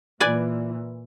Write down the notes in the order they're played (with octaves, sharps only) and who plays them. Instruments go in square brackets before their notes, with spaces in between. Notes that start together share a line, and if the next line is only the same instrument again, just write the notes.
[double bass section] A#2 E3 [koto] B4 D5 G#5